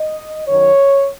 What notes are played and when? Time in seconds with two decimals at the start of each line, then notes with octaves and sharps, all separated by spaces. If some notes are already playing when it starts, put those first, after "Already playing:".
Already playing: D#5
0.48 F#2 D#3 F#3 C#5